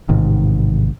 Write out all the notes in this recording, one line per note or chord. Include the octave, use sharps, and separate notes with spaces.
A1 G#2 C3 D#3